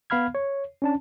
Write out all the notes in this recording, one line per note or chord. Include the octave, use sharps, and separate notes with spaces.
B3 F5 B5 F6 G#6
C#5
C#4 D4 A5